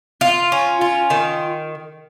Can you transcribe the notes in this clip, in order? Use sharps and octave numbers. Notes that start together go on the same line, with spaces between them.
F4
C#4
F4
D#3